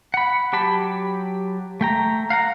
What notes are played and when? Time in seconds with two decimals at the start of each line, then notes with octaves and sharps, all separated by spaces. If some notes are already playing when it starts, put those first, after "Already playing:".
0.14 F#5 B5
0.53 F#3 G4 A5 B5
1.81 A3 G5 A#5
2.30 F5 F#5 A#5